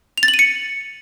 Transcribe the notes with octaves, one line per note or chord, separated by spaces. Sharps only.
F7
A6
F#7
D#7
C#7